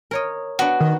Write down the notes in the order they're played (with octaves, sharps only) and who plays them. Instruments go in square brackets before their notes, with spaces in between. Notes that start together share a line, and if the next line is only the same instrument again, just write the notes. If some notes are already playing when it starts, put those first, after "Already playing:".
[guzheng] A#4 C#5 D#5
[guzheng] B3 D4 [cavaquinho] F#4
[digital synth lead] D#3